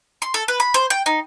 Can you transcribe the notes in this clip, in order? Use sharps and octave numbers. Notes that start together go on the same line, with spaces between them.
C6
A4
B4
B5
C5
G5
D#4